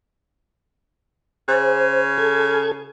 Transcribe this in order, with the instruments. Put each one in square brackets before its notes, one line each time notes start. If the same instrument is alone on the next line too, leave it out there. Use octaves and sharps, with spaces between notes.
[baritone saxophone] C#3 [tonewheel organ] C5
[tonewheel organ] A4 G#6